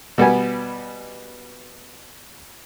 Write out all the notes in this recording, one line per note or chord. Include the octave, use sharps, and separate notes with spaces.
B2 G3 B3 G#5